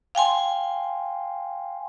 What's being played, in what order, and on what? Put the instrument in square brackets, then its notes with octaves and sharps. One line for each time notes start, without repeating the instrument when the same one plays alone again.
[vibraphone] F5 G5 G#5 C6